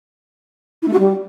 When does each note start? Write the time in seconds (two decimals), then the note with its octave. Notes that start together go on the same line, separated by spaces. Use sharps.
0.82 E4
0.88 A3
0.93 F#4
0.99 G3